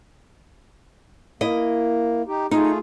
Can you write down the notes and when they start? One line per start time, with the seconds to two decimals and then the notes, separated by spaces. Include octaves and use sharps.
1.41 A#3 E4 D#5
2.28 D#4 G4
2.51 A3 D#4 F4 G#4